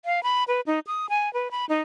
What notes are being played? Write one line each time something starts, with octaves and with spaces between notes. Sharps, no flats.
F5
B5
B4
D#4
D#6
G#5
B4
B5
D#4